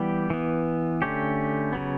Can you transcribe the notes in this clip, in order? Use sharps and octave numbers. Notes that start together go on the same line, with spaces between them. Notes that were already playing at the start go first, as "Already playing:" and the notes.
Already playing: E3 G3 B3 G4
E3 B3
D3 A3 C#4 G4
C#3 F#3 B3